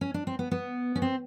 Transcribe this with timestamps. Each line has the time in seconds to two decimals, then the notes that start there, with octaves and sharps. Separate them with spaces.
0.01 C#4
0.14 D4
0.27 C4
0.39 B3
0.51 B3
0.96 C#4
1.02 C4